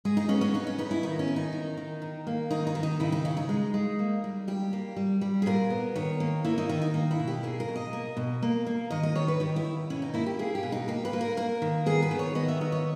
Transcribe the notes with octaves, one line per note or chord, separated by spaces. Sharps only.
G#3 G#4
D#4
B3 C#4
C#4
B3 D#4
C#4
B3 D#4
E4
D#3 D#4
C#4
D#3
D#4
D#3
D#3
D#3
A#3
D#3 D#4
D#4
D#3
D#4
C#3 E4
D#4
C#3 C#4
D#4
G#3
G#3
A#3
G3
G3 G4
A#3
G3
G3
G#4
A#2 A#4
B3
D#3 C#5
A#3
A#3 E4
D#4
D#3 D#4
D#4
A#3 D#4
E4
B2
G4
A#3 G#4
A#4
B2
D#5
A#3
B2
A#3
A#3
D#3 D#5
D#5
D#3 C#5
B4
D#3 G4
E4
D#3
B2 C#4
D#4
A#3 E4
G4
A#3 G#4
G4
B2
D#4
A#3 G4
B4
A#3
A#4
A#3 A#4
D#3
B3 G#4
B4
D#3
C#5
B3 D#5
E5
D#3 D#5
C#5